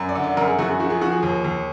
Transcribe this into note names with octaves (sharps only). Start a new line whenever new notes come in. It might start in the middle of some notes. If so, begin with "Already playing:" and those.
Already playing: F#2
D5
D3
D5
F#2 A#4
G#4
F#2 F#4
G#4
F3 F#4
G#4
F3 F#4
G#4
D#2
D#2